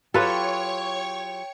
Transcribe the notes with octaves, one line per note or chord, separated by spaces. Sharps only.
F#3 F4 G4 A4 B4 C#5 G5 C#6